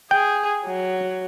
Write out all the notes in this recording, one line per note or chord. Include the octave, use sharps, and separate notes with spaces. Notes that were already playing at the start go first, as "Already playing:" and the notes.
G#4 G5
F#3